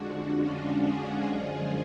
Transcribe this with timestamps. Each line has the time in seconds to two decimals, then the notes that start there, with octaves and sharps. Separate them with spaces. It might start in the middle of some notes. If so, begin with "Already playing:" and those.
Already playing: F2 D3 F3 G#3 D4 F#4
0.41 C#4 F4
0.84 F4 G#4
1.27 F#2 D3 F3 G#3